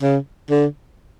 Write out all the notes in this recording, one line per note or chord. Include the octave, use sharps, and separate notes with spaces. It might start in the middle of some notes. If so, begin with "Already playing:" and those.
C#3
D3